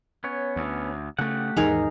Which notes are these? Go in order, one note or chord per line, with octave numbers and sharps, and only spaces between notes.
B3 C#4 C#5
D2
C#3 A3 G4 F#5
D#2 G#2 E3 D#4 G#4 A#4